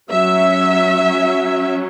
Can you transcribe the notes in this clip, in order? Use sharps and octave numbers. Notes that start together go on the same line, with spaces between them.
F#3 C#4 E5